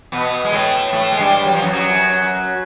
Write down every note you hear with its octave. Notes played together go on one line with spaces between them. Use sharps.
B2 B3
G#3
A2 A3
A2 A3
G#3
G2 G3
F#3
F3
F#2 F#3
F#2 F#3